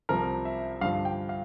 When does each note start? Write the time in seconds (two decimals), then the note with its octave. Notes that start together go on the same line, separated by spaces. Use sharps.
0.09 C2 C3 F3 A#4
0.45 E5
0.81 G2 D3 F3 F5
1.05 G5
1.29 F5